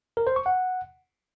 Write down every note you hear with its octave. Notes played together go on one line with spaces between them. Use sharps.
A#4
C5
C#6
F#5